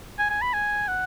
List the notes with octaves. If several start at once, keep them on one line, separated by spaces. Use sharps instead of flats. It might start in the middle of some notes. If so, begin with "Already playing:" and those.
G#5
G#5
B5
G#5
F#5